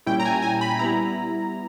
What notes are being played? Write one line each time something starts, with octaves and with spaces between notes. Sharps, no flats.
A#2 G3 C#4 E4 G5
A#5
G#5
G#5
B5
G3 B3 E4 A#5